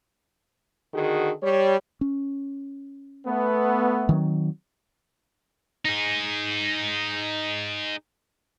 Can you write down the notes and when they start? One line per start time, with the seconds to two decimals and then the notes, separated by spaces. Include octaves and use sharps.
0.94 D3 D#3 F#4 G#4
1.42 G3 C#5
2.01 C#4
3.25 A3 B3
4.09 D#3 F#3 C4
5.85 D#4 G#4